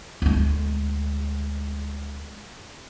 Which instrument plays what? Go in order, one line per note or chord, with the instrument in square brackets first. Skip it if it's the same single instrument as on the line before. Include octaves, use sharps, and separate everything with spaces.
[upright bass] D2 G#3